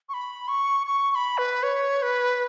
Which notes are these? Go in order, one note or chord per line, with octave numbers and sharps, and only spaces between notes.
C#6
B5
C#6
C#6
C#6
B5
B4
C#5
B4